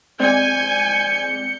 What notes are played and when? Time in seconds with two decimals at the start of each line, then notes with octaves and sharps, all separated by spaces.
0.20 G#3 C4 D5 G#5 G6 C#7